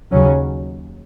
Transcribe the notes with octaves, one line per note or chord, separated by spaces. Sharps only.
D#2 C#3 F#3 C#4